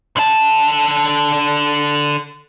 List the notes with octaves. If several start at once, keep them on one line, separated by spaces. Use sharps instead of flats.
D3 A5